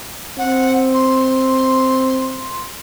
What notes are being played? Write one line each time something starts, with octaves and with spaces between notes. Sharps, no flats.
C4 F#5
C6